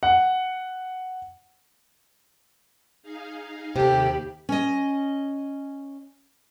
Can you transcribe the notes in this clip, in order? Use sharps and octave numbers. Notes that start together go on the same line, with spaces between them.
F#5
D#4 G#4 F5
D#2 C3 G4 A4 G5 B5
C#4 D#5